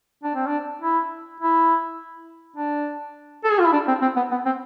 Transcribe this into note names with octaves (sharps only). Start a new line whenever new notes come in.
D4
C4
D4
E4
E4
D4
A4
G#4
F4
E4
D4
C4
C4
B3
B3
C4